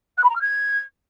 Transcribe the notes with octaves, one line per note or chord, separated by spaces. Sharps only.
F#6
B5
A#5
F6
G#6